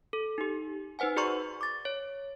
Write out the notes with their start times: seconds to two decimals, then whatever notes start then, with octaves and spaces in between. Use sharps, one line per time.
0.13 A4
0.38 D#4 G4
0.99 D#4 B4 C5 F#5 G#5
1.16 F#4 G#4 D5 A#5 C6 C#6
1.61 D6 A6
1.85 C#5